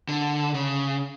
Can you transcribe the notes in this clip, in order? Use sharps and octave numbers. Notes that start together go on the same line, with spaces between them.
D3
C#3